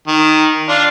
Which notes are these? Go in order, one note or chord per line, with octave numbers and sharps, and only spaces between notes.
D#3
D4 F4